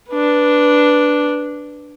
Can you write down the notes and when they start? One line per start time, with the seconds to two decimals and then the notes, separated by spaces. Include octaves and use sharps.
0.10 D4 B4